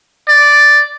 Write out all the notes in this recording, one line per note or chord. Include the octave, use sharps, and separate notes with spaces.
D5